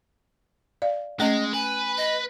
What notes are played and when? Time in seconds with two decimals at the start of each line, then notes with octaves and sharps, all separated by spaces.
0.82 D5 F5
1.20 G#3 A3 C#4 D#5
1.53 B4 G#5
1.97 D#5